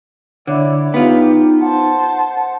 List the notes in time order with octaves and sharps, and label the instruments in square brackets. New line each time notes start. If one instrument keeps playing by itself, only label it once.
[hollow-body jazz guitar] D3 [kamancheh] E4 D5 [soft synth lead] C#5
[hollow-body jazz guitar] B3 F4 [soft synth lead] D#4 [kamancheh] G4
[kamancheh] C5 A5 [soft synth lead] F#5